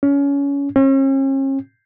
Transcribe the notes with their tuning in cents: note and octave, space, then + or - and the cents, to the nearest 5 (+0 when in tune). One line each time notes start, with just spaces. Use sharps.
C#4 +25
C#4 -40